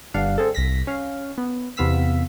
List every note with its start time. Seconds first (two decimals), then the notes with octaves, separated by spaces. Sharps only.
0.14 G1 G2 D4 F5 F#5
0.38 C4 G#4 A4
0.55 C2 A#6 B6
0.87 C#4 F5
1.38 B3
1.77 E2 C3 B3 F5 E6 B6